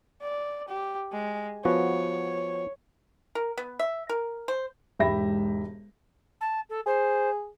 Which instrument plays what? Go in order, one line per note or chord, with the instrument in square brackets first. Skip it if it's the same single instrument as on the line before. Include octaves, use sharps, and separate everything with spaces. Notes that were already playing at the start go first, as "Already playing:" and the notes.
[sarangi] D5
G4
G#3
[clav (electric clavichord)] F3 B3 F#4 [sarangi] C#5
[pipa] A#4
B3
E5
A#4
C5
[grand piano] E1 G#2 G4 E5 B5 A#6
[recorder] A5
A4
[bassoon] G#4 [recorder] C5